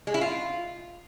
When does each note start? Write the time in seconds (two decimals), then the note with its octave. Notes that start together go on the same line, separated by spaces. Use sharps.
0.07 G#3
0.14 E4
0.21 F4